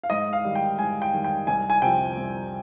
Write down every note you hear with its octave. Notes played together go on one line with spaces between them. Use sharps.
F5
G#2 D#5
F5
D#3 G3
G5
G#2 G#5
G5
D#3 G3
G5
C2 G#5
G#5
C3 F3 G5
C2